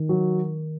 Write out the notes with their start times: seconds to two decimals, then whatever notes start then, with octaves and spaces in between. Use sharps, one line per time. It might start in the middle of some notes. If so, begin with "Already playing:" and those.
Already playing: D#3
0.09 F#3